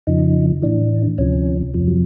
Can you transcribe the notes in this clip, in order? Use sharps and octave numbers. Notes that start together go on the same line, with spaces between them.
F2 C#3 F3 D#4
A2 E3 D4
D2 C3 F3 C#4
F2 C3 F3
F#3